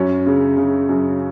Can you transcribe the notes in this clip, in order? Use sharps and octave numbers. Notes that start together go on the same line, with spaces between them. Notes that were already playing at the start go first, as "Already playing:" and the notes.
Already playing: F#2 C#4
C#3
C#3
F#2